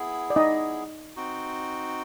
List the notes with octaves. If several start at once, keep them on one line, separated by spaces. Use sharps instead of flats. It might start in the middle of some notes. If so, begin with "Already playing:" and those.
Already playing: B3 E4 G#4
D5
D#4 D#5
C4 D#4 F#4